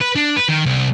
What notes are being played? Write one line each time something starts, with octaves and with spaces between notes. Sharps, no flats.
B4
D4
B4
D#3
C2